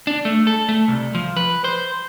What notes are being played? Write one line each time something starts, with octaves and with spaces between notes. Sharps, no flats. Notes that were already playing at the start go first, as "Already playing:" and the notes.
D4
A3
A4
A3
C2
F3
B4
C5